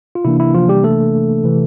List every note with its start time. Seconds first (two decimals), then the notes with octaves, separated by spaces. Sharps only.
0.15 F4
0.25 C3 E3 A#3 D4 E4
0.40 E4
0.54 F3 F4
0.69 G3 G4
0.84 A3 A4
1.44 C3 E3